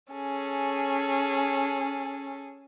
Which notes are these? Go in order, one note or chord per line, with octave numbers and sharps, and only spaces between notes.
C#4 G#4 A4